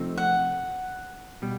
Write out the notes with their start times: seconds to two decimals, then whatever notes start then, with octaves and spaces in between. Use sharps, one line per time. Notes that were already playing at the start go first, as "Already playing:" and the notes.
Already playing: C3 F3 A3 C4 D#4
0.18 F#5
1.42 B2 G3